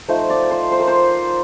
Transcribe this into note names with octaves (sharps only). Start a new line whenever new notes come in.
F3 A3 D#4 C5
D5
C5
C5
A#4
C5